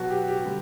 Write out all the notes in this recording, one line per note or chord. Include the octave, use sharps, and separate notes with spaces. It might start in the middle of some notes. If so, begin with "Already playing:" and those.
Already playing: B2 F#3 F#4
G4
G4
D3 G3